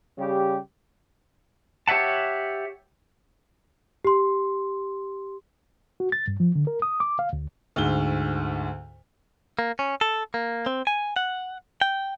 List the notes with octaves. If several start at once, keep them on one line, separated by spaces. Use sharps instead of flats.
C#3 G3 G4
G4 C#5 E5 F#5 A5
G4 C6
F#4
A6
G2
F3
D3
A#4
D#6
D6
F5
D2
D2 G#2 G7
A#3
C#4
A4
A#3
C4
G#5
F#5
G5